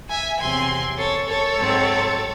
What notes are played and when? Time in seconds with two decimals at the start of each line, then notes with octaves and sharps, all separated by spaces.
0.09 E5 G#5
0.39 E2 C3 F#3 C4 G#5 C6
0.97 A4 C#5
1.27 A4 C#5
1.57 G#2 F#3 C4